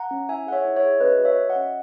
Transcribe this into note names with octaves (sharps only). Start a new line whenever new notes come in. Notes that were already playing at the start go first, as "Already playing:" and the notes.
Already playing: F#5 A#5
C#4
E4 E5 G#5
G#4 F#5
C#5 E5
E4
C#5 E5
G#4
C#4 B4 D#5
F#4
C#5 E5
F#4
D#5 F#5
C#4